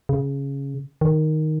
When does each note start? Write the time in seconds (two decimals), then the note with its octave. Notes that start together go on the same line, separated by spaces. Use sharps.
0.09 C#3
1.01 D#3